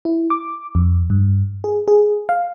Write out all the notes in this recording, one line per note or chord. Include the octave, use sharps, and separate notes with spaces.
E4
D6
F2
G2
G#4
G#4
F5